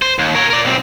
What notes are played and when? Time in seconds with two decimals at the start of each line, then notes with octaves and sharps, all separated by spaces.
0.02 C5
0.19 D#2
0.35 A#4 C#5
0.50 A#4 D5
0.65 B1 C4